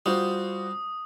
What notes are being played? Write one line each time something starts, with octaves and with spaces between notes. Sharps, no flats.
G3 F4 F#4 C5 D#6